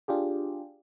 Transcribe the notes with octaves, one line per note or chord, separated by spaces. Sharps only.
D4 F4 G4 G#4